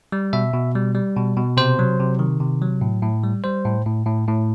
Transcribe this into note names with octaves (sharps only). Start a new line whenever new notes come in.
G3
B2 E5
B2
G3
G3
B2
B2
C3 C5
F#3
C3
D#3
C3
F#3
A2
A2
G3
G3 C5
A2
A2
A2
A2